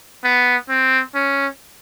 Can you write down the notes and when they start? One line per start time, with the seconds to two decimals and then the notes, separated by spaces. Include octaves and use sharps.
0.24 B3
0.69 C4
1.15 C#4